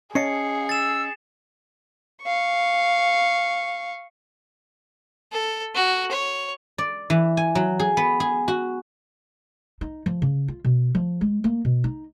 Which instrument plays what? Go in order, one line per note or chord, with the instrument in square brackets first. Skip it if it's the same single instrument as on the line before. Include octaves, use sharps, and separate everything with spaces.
[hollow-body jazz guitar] C#4 D#5 A5 [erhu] G#4 [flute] F5 [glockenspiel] C7 C#7
[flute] E6 [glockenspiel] A6 E7
[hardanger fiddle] F5 C#6
A4
F#4
C#5
[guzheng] D5
E3
G#5
F#3
G#4
B3
G#4
F#4
[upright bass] D#4
F3
C#3
F4
B2
F3
G#3
A#3
B2
D#4